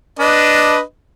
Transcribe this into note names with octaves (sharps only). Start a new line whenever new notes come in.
D4 B4 D#5